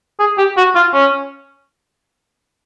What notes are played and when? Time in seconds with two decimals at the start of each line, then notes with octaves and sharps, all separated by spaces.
0.19 G#4
0.38 G4
0.57 F#4
0.75 F4
0.94 C#4